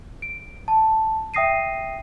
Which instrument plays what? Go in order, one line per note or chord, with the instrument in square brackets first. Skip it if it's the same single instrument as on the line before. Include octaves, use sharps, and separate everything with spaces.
[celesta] D7
A5
E5 G5 D#6 A#6 C7 D#7